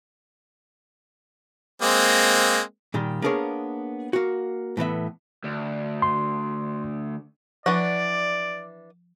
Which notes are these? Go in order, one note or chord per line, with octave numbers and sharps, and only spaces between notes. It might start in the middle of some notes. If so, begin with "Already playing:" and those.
G#3 A#3 C4
A#2 D#3 G3
A#3 B3 D4 G#4 A#4 C#5
A#3 F#4
A2 E3 B3 E5
D2
C6
E3 F3 D4 D5 F#5